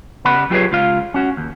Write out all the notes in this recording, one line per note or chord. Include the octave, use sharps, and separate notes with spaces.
C#3 G3 B3 F#5 B5
F#3 F4 G4 G#4 B4 C#5
C#2 F4 F5
C#4 F#4
D#2